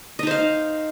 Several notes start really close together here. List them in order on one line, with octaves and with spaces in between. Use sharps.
D#5 D#4 C5 F5